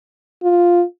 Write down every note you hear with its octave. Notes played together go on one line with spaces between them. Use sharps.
F4